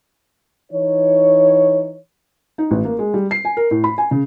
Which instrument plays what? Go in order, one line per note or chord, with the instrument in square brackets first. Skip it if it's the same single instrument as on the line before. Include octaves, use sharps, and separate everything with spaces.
[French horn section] E3 D#4 C#5
[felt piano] D#4
A1
A#3
G#3
G3
C7
G#5
A#4
A2
B5
G#5
C#3